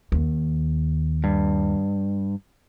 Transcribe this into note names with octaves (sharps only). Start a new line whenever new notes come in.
D#2
G2